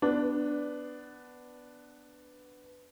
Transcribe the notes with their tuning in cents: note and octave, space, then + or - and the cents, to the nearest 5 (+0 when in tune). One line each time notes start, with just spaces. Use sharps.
B3 +10 D4 +0